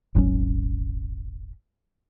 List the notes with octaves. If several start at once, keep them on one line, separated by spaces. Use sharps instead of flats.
D#1 G#1 F#3 C#4